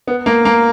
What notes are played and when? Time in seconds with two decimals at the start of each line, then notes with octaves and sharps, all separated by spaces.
0.07 B3
0.26 A#3
0.45 A#3